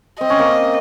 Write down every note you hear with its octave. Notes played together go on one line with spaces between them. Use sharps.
C4 D#5
C#4
A#3 C4